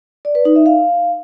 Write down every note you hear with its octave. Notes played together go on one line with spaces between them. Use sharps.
D5
B4
D#4
E5
F5